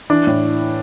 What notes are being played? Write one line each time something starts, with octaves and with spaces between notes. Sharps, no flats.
E3 D4
A2